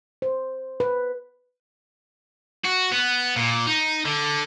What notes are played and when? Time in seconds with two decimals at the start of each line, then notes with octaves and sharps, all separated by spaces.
0.22 C5
0.80 B4
2.65 F#4
2.92 B3
3.36 A#2
3.67 D#4
4.05 D3